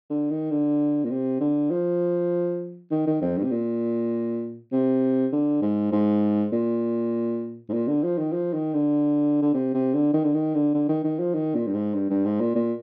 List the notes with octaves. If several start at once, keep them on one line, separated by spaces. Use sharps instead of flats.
D3
D#3
D3
A#2
C3
D3
F3
D#3
D#3
F2
G2
C3
A#2
C3
D3
G#2
G#2
A#2
G#2
A#2
D3
F3
D#3
F3
D#3
D3
D3
C3
C3
D3
D#3
D3
D#3
D3
D3
D#3
D#3
F3
D#3
A#2
G2
G#2
G2
G2
G#2
A#2
A#2